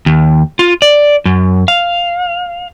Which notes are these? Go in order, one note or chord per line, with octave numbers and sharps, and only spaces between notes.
D#2
F4
D5
F#2
F5